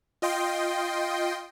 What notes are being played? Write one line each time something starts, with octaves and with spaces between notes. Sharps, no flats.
F4 D#5 G5 C6